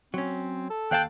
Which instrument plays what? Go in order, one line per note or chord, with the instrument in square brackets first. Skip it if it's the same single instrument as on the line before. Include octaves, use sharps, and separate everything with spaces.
[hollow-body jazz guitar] F#3 C#4 [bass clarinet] C4
[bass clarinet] A4
[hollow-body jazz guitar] D#2 F5 A5 [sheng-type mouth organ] G5 F#6